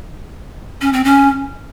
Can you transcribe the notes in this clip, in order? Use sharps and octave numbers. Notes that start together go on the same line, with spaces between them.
C#4
C4
C#4